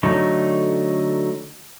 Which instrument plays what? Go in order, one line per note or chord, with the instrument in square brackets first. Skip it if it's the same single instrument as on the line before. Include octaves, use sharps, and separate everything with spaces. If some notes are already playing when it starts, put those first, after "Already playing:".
[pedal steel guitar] D3 F#3 A3 D#4